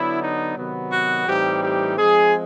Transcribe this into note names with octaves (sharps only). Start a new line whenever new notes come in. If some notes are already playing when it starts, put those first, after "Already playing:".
Already playing: D3 F#3 B3 D4 E4
D#4
C3 D#3 F#3 B3
F#4
A2 E3 G3 C4 D#4 G4
G4
F3 G#3 C4 G#4